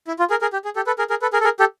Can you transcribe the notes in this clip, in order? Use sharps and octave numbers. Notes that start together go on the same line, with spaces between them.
E4
F4
G#4 A#4
G#4 A#4
G4
G#4
G4 A4
A4 B4
G#4 A#4
G#4 A#4
A4 B4
G#4 A#4
A4
G#4 A#4
G4 A4